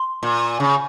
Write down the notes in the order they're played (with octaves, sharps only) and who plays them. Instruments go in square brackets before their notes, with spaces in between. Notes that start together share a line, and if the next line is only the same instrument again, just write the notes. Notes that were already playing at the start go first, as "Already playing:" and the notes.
Already playing: [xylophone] C6
[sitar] A#2
C#3